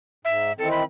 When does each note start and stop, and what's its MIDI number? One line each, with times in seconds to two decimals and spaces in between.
0.25 0.51 44
0.25 0.52 76
0.59 0.83 51
0.59 0.83 52
0.59 0.83 60
0.59 0.69 69
0.71 0.84 83